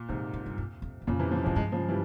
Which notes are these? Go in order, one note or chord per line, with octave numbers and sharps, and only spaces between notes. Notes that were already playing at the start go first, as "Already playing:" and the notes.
Already playing: A#2
G#2 C3 E3
C#3
G2
F2
F2
E2
F2 A#2 C#3
C3 E3
C#3 F3
G#2 F3 G#3
G2 F3 G#3
C#3 F3
E3 G3